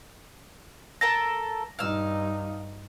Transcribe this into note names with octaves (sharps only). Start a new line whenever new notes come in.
A4 A#4 A5 A#6
G2 D#4 F5 E6